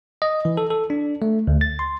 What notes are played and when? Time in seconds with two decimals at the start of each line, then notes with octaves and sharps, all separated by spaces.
0.22 D#5
0.45 E3
0.57 A4
0.70 A4
0.90 D4
1.22 A3
1.47 D2
1.61 A6
1.79 C6